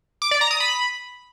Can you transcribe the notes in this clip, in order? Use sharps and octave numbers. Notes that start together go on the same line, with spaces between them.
D6
D5
A#5
D#6
B5